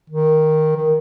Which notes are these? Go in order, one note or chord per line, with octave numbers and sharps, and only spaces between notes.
D#3
D#3